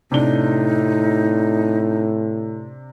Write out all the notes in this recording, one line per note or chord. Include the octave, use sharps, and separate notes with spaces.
A2 C3 D4 D#4 G7